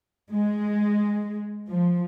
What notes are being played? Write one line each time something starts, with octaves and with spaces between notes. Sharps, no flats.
G#3
F3